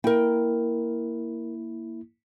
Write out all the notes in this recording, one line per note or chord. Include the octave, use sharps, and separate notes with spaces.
A#3 E4 A#4 G5